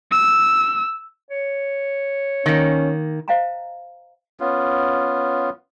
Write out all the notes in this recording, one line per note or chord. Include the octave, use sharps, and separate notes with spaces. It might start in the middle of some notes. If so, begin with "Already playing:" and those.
E6
C#5
D#3 A#3 C#4
C5 D#5 F5 G5 A5 A#5
B3 C#4 F4